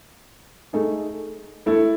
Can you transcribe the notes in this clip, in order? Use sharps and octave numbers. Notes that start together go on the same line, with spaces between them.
A3 D#4 G#4
A3 E4 A4